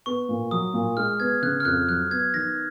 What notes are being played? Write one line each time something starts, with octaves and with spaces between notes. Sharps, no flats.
B3 C#6
A#2
F#3 D#6
A#2
G#3 F6
B3 G#6
C#3 F#6
F6
F2 F#6
F#3 F#6
B3 G#6
D#3 A#6